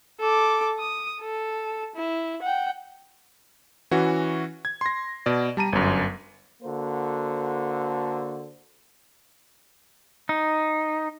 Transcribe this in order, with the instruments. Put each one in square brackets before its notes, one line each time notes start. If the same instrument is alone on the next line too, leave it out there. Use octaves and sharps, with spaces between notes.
[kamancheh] A4 D6
D#6
A4
E4
F#5 G5
[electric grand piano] E3 C#4 F#4
G#6
C6 A#6
B2 D5
G3 A5 A#5 D#7
G1 F#2
[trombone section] D3 A#3 F#4 A4 C5
[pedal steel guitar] D#4